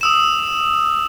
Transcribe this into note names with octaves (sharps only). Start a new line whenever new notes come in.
D#6 E6 E7